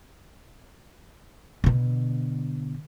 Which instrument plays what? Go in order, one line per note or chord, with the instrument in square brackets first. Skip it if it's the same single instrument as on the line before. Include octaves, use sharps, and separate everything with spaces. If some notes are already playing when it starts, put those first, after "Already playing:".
[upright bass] B2 D3